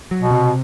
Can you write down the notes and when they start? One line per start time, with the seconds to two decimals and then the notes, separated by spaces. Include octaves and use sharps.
0.11 F#3
0.21 B2
0.31 C3